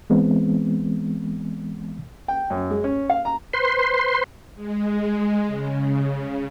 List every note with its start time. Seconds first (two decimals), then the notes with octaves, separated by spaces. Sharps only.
0.10 E3 G#3 B3 C4
2.28 G5
2.50 F#2
2.71 G#3
2.84 C#4
3.10 F5
3.25 A#5
3.53 B4 C5 C6
4.55 G#3
5.47 C#3